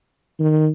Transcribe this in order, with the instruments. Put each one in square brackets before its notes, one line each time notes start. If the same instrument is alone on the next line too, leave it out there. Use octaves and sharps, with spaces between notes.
[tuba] D#3